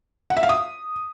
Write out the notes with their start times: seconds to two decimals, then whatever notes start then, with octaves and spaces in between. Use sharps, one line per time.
0.30 F#5
0.37 E5
0.43 F5
0.49 D#6